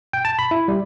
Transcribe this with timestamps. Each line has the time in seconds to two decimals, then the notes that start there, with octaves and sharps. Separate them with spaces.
0.13 G5
0.25 A5
0.39 B5
0.51 E4
0.68 G3